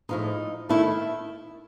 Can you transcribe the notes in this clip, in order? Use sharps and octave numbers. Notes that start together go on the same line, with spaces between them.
A2 F3 G#3 D#4
D#3 A3 E4